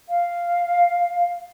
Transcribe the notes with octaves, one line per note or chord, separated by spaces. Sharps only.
F5